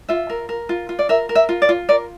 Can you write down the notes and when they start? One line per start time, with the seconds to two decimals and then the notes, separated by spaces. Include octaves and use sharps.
0.09 F4 E5
0.29 A#4
0.49 A#4
0.69 F4
0.89 F4
0.99 D5
1.09 A#4 E5
1.29 A#4
1.35 E5
1.49 F4
1.62 D5
1.69 F4
1.89 A#4 D5